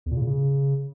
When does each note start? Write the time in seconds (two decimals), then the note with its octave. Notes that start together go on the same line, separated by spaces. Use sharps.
0.06 E2
0.11 A#2
0.16 C#3
0.22 A#2
0.27 C#3